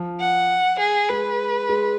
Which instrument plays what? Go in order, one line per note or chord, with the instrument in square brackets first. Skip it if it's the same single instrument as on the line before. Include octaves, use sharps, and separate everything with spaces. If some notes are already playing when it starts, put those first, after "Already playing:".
Already playing: [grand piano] F3
[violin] F#5
G#4
[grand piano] G#3 [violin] B4
[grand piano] G#3